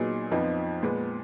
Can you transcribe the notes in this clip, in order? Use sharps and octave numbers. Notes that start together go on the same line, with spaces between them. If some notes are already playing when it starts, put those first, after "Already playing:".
Already playing: A#2 F#3 B3 D#4 G#4
F2 F3 B3 D#4
A#2 G#3 B3